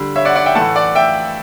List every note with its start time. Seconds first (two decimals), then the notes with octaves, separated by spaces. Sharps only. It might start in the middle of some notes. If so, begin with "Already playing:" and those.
Already playing: D3 G3
0.16 C#5 E5
0.25 D5 F#5
0.35 D5 F#5
0.46 E5 G5
0.55 A2 E3 A3 F#5 A5
0.76 D5 F#5
0.95 E5 G5